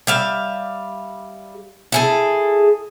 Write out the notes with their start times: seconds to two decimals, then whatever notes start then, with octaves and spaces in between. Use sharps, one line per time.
0.07 G3 E5 F5
1.92 E4 G#4 A4